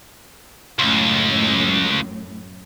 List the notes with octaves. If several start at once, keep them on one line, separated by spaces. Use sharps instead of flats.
C#2 F#2 A2